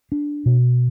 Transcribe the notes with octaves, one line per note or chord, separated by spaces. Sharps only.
D4
B2